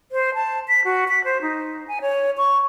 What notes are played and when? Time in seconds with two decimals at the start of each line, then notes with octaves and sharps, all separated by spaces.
0.12 C5
0.34 A5
0.68 B6
0.85 F#4
1.08 B6
1.24 C5
1.41 D#4
1.88 G#5
2.01 C#5
2.38 C#6